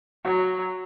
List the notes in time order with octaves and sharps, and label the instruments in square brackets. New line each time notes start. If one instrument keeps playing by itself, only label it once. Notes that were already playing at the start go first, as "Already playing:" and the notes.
[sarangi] F#3 [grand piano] F#4